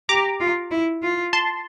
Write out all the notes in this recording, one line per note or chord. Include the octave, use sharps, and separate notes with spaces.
G4 A#5 D6
F4
E4
F4
A5 C6